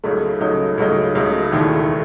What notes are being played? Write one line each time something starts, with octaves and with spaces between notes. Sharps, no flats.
C#2 C#3 F#3 A3 D#4
C#2 C#3 F#3 A3 D#4
C#2 C#3 F#3 A3 D#4
C#2 C#3 F#3 A3 D#4
E1 D#2 D#3 A3 E4